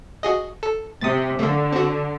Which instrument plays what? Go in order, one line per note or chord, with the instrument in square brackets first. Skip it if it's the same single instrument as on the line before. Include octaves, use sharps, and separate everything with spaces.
[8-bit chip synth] F#4 G#4 D#5
A4
[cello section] C3 [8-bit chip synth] D#6 A6
[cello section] D3 [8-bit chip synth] A3 A#3
[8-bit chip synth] C4 F#4